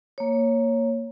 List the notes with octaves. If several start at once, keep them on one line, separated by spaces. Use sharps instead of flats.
A#3 C#5